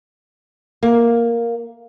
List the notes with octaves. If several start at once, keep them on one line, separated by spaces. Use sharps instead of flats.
A#3